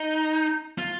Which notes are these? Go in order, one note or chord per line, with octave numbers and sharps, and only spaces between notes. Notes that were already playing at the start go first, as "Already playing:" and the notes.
Already playing: D#4
F4